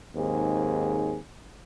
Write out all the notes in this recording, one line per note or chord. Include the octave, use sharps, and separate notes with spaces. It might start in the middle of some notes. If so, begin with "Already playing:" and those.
D#2 G#2 C4 G#4